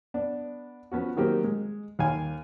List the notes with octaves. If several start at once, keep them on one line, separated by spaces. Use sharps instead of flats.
B3 D4
F3 B3 C#4 F#4
D#3 F#3 A#3 C4 G4
G#3
D#2 F5 G#5